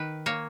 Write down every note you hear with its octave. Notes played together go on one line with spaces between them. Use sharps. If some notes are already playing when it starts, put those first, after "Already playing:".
Already playing: D#3 B4
A#3 C#5